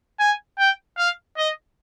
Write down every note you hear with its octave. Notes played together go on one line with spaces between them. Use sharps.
G#5
G5
F5
D#5